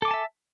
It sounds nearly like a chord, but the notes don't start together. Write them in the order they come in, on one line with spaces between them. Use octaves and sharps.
A4 D6 G#5 A5 E5